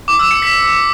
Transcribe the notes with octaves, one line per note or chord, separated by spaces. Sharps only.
D6
E6
C#7
B6